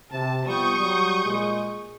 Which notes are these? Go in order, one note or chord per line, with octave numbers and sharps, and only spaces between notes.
C3 A5
F3 G3 B3 C#6 D#6 G6
F#3 G3
A#2 G#3